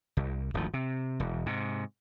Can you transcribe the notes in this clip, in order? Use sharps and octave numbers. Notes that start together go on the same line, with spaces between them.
C2
D1 G#1 D2 F3
C3
E1
G#2 C3